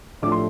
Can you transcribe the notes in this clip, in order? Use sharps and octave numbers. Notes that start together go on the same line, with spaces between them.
A2 F3 A3 D4 D6
C6